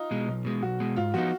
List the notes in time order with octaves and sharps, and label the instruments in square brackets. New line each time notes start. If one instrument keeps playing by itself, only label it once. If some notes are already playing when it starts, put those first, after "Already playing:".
Already playing: [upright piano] D#4 F4
[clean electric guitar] B2 G#3
B1
B2 G#3
[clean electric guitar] B1 [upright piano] F#4
[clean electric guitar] B2 G#3
[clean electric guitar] G#2 [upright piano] F4
[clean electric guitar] F3 B3 D#4 [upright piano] F#4